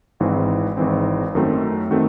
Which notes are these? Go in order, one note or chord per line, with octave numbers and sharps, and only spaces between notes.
G#1 G#2 E3 C4
G#1 G#2 E3 C4
F#2 D#3 A3 C4 F#4
D#3 A3 C4 F#4